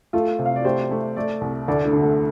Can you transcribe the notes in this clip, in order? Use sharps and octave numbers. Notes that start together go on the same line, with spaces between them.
A3 F4 A4
C3
F5
D5
A3 G4 C5
A3
A3 A4 D5
C2
D2 A4 D5
A3 D4
D3
A3